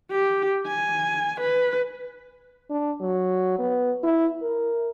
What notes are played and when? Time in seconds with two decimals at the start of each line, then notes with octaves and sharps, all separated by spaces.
0.11 G4
0.67 G#5
1.41 B4
2.70 D4
3.01 F#3
3.59 B3
4.03 E4
4.42 A#4